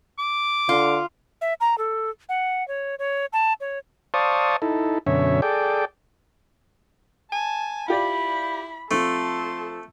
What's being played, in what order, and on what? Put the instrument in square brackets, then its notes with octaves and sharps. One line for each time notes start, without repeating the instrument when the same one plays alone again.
[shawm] D6
[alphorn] D3 [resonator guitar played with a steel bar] F4
[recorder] E5
A#5
A4
F#5
C#5
C#5
A5
C#5
[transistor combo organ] C5 D5 F5 A5 C#6 D#6
D#4 E4 A4
F#2 B2 D3 C#4 C#5 E5
G#4 A4 D5 G5
[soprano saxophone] G#5 [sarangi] A5
[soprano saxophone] E4 [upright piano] F4 G4 D5 [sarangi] B5
[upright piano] F3 C4 [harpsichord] A3 [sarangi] A4 [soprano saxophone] C6